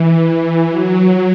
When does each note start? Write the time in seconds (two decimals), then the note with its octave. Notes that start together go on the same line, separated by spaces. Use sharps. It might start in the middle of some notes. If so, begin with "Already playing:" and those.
Already playing: E3
0.70 F#3